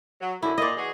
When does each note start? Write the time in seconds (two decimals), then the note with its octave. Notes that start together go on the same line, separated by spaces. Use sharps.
0.21 F#3
0.43 F#2 D3 E4
0.58 A#2 D5 D#5
0.77 E3 F#4 G#4